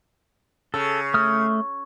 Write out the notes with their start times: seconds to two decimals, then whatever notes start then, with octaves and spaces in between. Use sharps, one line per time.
0.74 C#3 A4
1.14 A3 D#6 F6